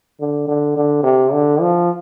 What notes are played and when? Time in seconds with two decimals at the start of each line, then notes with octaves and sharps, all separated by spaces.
0.20 D3
0.48 D3
0.77 D3
1.04 C3
1.32 D3
1.61 F3